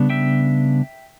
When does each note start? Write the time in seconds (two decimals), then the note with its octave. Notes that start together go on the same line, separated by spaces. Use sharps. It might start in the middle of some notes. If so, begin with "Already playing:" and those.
Already playing: C#3 G3 B3 D4
0.10 E5 G5